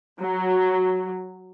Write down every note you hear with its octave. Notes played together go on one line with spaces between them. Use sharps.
F#3